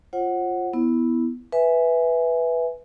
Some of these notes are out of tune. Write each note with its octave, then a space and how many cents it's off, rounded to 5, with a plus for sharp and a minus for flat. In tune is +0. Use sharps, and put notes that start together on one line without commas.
F4 +0 C5 +45 F#5 +0
B3 +0 E4 -5
B4 +0 E5 +0 G#5 +0